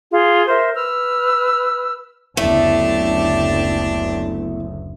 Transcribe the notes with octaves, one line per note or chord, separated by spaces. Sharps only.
F4 G#4
A#4 C5 E5
B4 E6 F6
F#1 D2 A3 B3 D4 E4 G4 A5